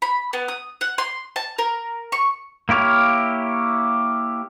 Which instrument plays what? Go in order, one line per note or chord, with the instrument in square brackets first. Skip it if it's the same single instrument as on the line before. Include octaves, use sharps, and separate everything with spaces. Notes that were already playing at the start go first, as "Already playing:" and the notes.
[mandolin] B5
B3
D#6
F#5
C6
A5
A#4
C#6
[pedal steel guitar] A#3 E4 G4 C#5 F5